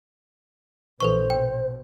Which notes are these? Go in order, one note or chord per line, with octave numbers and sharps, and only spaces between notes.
A#1 E3 A4 B4 C5 C#6
B2 G5